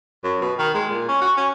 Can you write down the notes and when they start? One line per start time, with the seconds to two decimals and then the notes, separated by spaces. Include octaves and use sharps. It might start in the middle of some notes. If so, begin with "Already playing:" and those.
0.24 F#2
0.41 B2
0.59 D#3
0.74 G#3
0.90 A#2
1.08 C#4
1.21 F#4
1.37 C#4